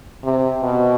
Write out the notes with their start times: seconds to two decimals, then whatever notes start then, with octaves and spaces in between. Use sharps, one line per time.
0.24 C3
0.61 B2